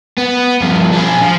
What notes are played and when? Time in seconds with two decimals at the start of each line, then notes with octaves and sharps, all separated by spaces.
0.17 B3
0.61 G2 F3
0.92 D4 G#4
1.22 F3